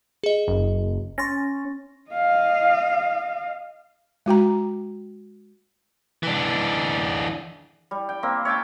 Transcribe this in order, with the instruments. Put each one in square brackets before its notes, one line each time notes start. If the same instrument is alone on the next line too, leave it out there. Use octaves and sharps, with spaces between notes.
[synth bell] G#4 D#5
[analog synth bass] F#1
[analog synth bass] C#4 [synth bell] C6 A6 A#6
[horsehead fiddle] D#5 F5
[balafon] G#3 F#4 G5 A#5
[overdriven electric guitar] E3 D4
[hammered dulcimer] G3
G5
A#3 C4 E5
C#5 E5 G5 A5